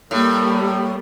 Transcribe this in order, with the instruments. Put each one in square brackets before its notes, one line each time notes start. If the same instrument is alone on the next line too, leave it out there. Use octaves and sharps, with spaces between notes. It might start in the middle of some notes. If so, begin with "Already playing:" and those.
[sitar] A2 [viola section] G3 A#3